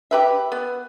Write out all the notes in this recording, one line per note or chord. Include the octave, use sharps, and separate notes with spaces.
G4 B4 E5
B3